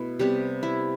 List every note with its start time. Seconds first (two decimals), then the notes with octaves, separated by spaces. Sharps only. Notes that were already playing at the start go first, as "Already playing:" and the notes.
Already playing: B2 A3 E4
0.19 C3 G3 B3 G4
0.63 E4